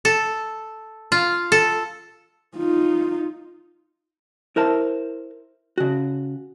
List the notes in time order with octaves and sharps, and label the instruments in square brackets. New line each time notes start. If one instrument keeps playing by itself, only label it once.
[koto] A4
F4
A4
[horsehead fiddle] D#4 F4
[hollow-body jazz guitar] E4 A#4 C5 A5
C#3 F#4